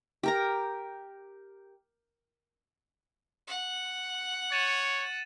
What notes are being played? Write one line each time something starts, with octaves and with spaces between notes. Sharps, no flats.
G4 A#4 A#5
F#5
C#5 A6 D#7 E7